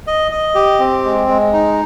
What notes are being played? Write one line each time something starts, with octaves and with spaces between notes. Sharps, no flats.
D#5
D#5
G4
C4
G#3
G#3
D#4